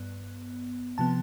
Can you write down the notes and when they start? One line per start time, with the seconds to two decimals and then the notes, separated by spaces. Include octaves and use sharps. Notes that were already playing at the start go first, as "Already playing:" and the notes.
Already playing: G2 B3
0.98 C3 F3 B3 A5